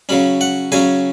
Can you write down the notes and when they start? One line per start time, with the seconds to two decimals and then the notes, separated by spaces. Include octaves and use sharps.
0.09 C#3 F#3 C#4 B5
0.41 F#5
0.72 C#3 F#3 C#4 G#5